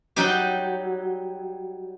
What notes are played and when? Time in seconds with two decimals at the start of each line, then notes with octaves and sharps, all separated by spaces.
0.16 F#3 G3 D#4 G4